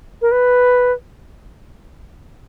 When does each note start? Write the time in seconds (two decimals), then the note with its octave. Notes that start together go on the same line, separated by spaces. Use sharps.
0.22 A#4
0.32 B4